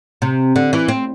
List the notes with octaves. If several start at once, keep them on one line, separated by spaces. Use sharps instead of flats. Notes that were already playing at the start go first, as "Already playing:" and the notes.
C3
D3
E3
C4